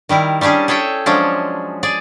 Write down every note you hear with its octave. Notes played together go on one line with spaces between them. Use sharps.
D#3 G3 E4 A#4
G3 C#4 D4 G4 G#4
G#4 A4 C#5 E5 G5
F3 F#3 G#3 C#4 D4
G#4 D5